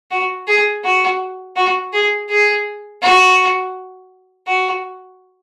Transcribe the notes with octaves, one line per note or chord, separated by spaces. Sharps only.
F#4
G#4
F#4
F#4
G#4
G#4
F#4
F#4